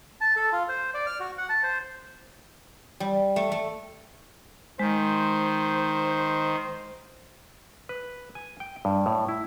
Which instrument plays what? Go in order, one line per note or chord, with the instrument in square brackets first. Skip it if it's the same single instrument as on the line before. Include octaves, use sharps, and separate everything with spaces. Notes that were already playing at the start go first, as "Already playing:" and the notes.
[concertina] A5
A4
F4
C5
D5
F6
F#4
F#5
A5
C5
[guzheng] G3
A3
A3
[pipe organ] D#3 [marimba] G#3 [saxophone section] C5
[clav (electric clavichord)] B4
G#5
G5
G2
A2
E4